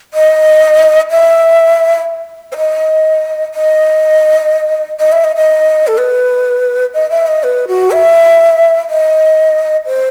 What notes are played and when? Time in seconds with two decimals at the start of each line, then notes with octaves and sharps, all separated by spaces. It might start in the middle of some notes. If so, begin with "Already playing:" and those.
0.14 D#5
1.11 E5
2.52 C5
2.57 D#5
3.54 D#5
5.00 D#5
5.12 E5
5.24 D#5
5.36 D#5
5.87 A4
5.98 B4
6.94 D#5
7.10 E5
7.27 D#5
7.43 B4
7.68 F#4
7.91 E5
8.89 D#5
9.86 C5